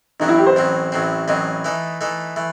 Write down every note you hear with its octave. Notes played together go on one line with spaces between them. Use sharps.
A1 A2 F#3 C4 D#4
E4
G4
C5
A1 A2 F#3 C4
A1 A2 F#3 C4
A1 A2 F#3 C4 D#5
E3 A3 D#4 A4
E3 A3 D#4 A4
E3 A3